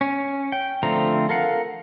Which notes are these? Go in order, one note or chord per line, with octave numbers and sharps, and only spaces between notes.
C#4
G5
D3 F3 A3 C4 A#5
A4 A#4 F5 F#5